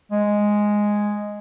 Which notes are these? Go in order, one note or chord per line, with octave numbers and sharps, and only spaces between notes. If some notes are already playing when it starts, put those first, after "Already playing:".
G#3